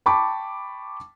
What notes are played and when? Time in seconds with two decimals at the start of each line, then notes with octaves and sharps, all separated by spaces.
0.06 G5 A5 B5 C#6 D6